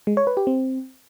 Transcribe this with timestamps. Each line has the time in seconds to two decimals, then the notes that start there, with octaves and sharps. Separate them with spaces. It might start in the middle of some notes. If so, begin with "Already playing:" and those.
0.07 G#3
0.17 C#5
0.27 B4
0.37 G4
0.47 C4